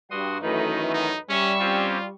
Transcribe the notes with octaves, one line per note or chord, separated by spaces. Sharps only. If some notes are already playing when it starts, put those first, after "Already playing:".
G2 F#4 C6 D#6
F#2 D#3 E3 A3 D#4 B4
D#4
G3 C#4 E5 C#6 E6
C4 C#4 F4 G4